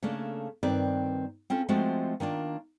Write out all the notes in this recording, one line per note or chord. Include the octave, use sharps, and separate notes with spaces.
C#3 A3 A#3 D4
G2 D#3 C4 B4 D5
C4 C#4 F4 A4
F3 G#3 A3 C4 F4 F#4
D#3 A#3 D4 F4